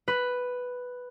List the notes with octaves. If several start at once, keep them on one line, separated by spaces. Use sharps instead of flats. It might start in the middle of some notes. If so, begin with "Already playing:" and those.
B4